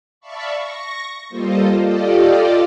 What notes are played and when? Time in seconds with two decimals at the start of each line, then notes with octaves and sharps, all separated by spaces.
0.20 D5 E5 F5 A5 B5 C#6
0.55 C#6 A#6
1.29 G3 A#3 F4 A4 C5 D#5
1.81 F4 G4 A4 D5 D#5 F5